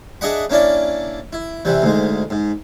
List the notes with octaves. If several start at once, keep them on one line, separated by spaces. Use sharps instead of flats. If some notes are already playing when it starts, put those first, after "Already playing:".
D4 G#4 D#5 E5 F#5 B5
A#3 C#4 D4 E4 D5
E4
C3 E3 G3
D2 G#2 G#3
G#2